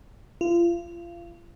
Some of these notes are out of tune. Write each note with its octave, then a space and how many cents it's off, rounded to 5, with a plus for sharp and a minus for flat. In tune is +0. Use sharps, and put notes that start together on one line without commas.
F4 -30